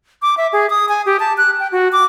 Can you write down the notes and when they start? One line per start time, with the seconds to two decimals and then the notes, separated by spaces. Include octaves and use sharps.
0.22 D6
0.37 E5
0.53 G#4
0.70 D#6
0.89 G#5
1.06 G4
1.20 A5
1.38 F#6
1.60 G5
1.72 F#4
1.92 D6